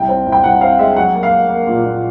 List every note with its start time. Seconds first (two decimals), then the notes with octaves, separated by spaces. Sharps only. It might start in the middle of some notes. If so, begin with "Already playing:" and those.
Already playing: C2 G5
0.09 C4
0.26 C2
0.32 G5
0.43 C2 F#5
0.61 C4 F5
0.79 G#3 E5
0.96 F#3 F#5
1.14 A#3
1.23 F5
1.32 A#3
1.49 A#3
1.67 A#2
1.84 A#2